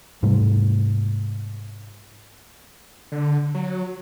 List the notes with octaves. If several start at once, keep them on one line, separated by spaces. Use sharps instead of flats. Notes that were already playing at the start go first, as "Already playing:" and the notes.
G#2 C3 G3 A3
D3
F#3